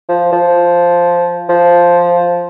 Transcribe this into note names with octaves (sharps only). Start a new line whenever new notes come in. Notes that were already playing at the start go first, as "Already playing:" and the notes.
F3
F3
F3